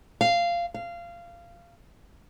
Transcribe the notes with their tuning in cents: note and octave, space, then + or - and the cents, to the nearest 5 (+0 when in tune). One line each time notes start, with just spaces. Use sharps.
F5 -15
F5 -20